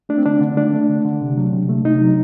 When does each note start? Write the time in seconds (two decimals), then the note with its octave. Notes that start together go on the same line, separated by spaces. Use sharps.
0.09 A3 D4
0.18 C4
0.25 D3 D4
0.41 D3
0.57 A3 D4
0.74 A3
0.89 D3
1.05 D3
1.21 C3
1.38 F#3
1.53 C3
1.69 A3
1.85 C3 D#4
2.01 F#3